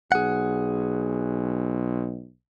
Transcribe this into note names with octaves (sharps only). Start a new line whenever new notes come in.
B1 G#4 F#5